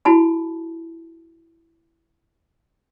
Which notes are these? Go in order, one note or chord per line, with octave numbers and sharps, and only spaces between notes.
E4 F#4 A5 B5